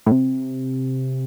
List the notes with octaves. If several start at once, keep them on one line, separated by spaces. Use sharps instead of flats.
A2
C3